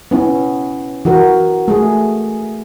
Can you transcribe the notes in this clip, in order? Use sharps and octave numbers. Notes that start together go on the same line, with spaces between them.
B3 C#4 E4
E3 F#4 A#4
A3 G#4